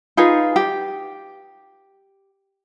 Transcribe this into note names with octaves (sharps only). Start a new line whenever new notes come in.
D#4 F4 G#4 B4
G4